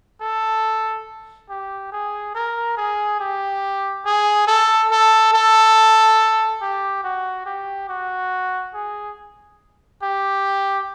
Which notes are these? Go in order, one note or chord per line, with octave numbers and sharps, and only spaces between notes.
A4
G4
G#4
A#4
G#4
G4
G#4
A4
A4
A4
G4
F#4
G4
F#4
G#4
G4